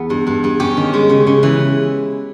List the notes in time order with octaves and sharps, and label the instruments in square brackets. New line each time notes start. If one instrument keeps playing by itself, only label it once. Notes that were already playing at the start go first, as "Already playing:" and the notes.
Already playing: [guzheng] E2 B3
G2
G2
G2
C#4 G4
D#3
G#3
C#3
C#3
E3